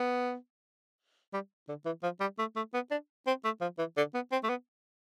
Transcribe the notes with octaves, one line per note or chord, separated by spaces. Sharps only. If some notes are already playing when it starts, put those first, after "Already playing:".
Already playing: B3
G3
D3
E3
F3
G3
A3
A3
B3
D4
C4
A3
F3
E3
D3
B3
C4
A3
B3